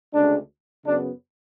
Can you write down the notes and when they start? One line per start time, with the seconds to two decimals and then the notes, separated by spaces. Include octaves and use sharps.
0.13 D2 C#3 G#3 D4
0.85 F#2 C#3 F#3 B3 D4